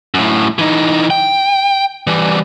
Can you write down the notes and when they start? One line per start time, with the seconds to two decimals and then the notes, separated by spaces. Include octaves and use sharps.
0.14 F#2 A2
0.59 E3 D#4
1.10 G5
2.07 E3 G3